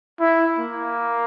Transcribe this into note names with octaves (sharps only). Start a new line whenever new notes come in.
E4
A#3